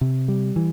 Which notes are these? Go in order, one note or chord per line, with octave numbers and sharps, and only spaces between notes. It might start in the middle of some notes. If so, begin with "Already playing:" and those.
C3
G3
E3